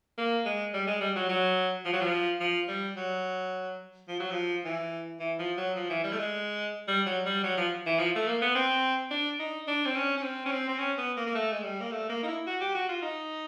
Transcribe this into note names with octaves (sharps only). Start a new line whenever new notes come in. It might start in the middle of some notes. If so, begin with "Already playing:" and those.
A#3
G#3
G3
G#3
G3
F#3
F#3
F3
F#3
F3
F3
G3
F#3
F3
F#3
F3
E3
E3
F3
F#3
F3
E3
G3
A3
G#3
G3
F#3
G3
F#3
F3
E3
F3
A3
A#3
B3
C4
D4
D#4
D4
C4
C#4
C#4
C4
C#4
C4
C4
C#4
B3
A#3
A#3
A3
G#3
G3
A#3
A3
A#3
D#4
E4
F#4
G4
F#4
F4
D#4